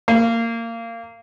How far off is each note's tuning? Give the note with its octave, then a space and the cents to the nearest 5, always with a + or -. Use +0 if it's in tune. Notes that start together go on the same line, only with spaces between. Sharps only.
A#3 -20